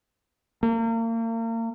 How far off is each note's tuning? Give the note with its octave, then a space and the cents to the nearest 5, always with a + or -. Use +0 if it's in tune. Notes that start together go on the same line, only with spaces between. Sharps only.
A#3 -35